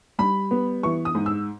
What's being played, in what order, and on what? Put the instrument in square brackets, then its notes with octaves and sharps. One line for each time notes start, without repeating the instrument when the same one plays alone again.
[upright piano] G3 B5
B3
E3 C#6
D#6
G#2
E6